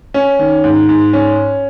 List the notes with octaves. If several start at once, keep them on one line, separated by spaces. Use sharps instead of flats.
C#4
D#3
G#2
G#2
C#4